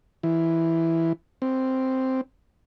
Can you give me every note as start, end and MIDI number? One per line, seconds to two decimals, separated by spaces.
0.23 1.13 52
1.42 2.21 60